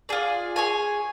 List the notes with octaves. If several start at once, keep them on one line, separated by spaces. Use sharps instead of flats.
F4 G#4 D5
G#4 C#5 G#5